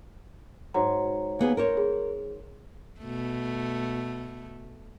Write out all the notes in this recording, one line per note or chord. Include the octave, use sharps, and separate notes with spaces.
G#2 F#3 A#5
D#2 B3 G#4
A#4 C5 C#5
G#4
B2 A3